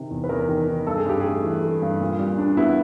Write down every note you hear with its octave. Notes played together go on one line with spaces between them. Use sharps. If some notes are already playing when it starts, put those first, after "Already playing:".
Already playing: C3 D#3
E2
B4
E2 A#4
D#3
D#3
G2 A4
G#4
G2 G4
A3 G#4
E3
A3
G2
A#2
G3
D4
B3 E4